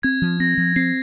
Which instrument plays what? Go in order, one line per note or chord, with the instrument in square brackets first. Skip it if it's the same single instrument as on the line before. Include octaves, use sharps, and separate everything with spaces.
[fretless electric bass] C4 [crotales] G#6
[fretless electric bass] F3
[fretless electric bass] C4 [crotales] A#6
[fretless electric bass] F3
[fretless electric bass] C4 [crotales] C7